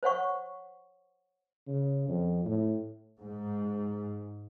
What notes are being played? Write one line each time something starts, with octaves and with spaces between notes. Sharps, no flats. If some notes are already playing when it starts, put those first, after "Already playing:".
C5 C#5 F#5 C#6
C#3
F2
A2
G#2